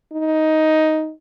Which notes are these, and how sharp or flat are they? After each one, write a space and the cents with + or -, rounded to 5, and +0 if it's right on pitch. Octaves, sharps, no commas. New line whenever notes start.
D#4 +10